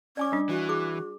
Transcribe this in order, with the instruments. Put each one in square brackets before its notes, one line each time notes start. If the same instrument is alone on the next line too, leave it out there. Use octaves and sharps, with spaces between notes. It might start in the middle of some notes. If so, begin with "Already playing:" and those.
[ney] C#4 [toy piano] D5 G#5 D6
[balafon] G3 D4
[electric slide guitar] E3 [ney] F#4
[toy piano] G#4 D6